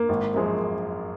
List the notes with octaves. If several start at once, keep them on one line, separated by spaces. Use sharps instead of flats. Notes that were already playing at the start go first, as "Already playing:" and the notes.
Already playing: A#3
G#1
F#2 F3 G#3